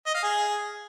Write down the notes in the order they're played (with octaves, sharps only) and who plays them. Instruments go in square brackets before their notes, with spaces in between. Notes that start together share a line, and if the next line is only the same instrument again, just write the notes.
[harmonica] D#5
F5
G#4